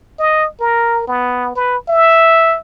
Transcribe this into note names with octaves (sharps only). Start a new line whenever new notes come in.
D#5
A#4
B3
B4
E5